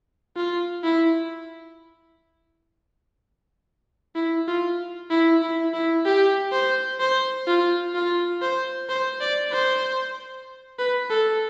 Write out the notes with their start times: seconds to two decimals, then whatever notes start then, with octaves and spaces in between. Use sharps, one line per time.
0.37 F4
0.84 E4
4.15 E4
4.48 F4
5.10 E4
5.42 E4
5.74 E4
6.05 G4
6.52 C5
7.00 C5
7.47 F4
7.95 F4
8.42 C5
8.89 C5
9.21 D5
9.52 C5
10.79 B4
11.10 A4